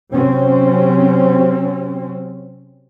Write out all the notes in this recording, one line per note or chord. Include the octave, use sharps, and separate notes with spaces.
C3 F#3 C4 C#4